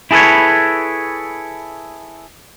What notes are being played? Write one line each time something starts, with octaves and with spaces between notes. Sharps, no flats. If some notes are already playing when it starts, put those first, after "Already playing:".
E4 G#4 A4 B4 C#5